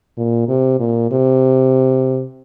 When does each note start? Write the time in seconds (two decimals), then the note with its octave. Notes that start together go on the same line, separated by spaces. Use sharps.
0.17 A#2
0.48 C3
0.79 A#2
1.11 C3